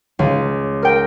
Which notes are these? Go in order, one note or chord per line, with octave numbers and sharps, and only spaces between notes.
C#2
A#4 G5